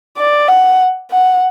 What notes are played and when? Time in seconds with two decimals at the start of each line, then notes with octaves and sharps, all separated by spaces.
0.18 D5
0.48 F#5
1.11 F#5